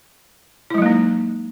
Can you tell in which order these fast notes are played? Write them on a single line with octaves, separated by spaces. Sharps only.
E4 G#3 F#3 A#3 D#4